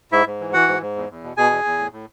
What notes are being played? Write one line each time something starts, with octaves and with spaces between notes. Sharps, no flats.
G#2 E4 E5
G#2
E3
E3 F#4 F#5
G#2
G#2
E2
E2
B2
B2 G#4 G#5
E2
E2
A2
A2